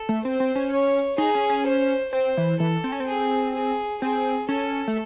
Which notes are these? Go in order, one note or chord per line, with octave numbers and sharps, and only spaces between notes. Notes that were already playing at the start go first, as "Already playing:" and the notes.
Already playing: A4
A3
C4 C5
C4
C#4
C#5
D#4 G#4
C#4
C#4
C5
C4 C5
E3
E3 A4
C4
C#4
C4
G#4
G#4
C4 G#4
C#4 A4
A3